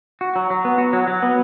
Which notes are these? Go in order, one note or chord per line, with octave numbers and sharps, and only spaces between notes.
F#4
F#3
F#3
B3
F#4
F#3
F#3
B3